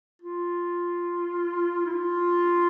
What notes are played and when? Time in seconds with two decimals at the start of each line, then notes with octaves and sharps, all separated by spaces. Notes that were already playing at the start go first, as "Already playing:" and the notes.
0.22 F4
1.86 E4
1.92 F4